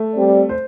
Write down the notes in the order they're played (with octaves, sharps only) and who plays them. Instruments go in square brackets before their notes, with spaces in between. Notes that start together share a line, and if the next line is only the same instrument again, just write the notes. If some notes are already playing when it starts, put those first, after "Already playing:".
Already playing: [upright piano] A3
[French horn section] G3 C4 G4 D5
[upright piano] C5